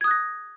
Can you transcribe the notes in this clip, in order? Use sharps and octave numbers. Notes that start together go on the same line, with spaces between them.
D#6 F#6 G#6 A#6